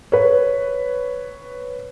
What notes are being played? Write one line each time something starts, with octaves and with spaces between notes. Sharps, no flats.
B4 C#5